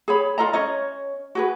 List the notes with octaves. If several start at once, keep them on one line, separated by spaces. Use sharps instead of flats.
G#4 C#5 B5
F4 A4 D#5 A#5
C#4 C#5 D#5
F#4 G#4 B4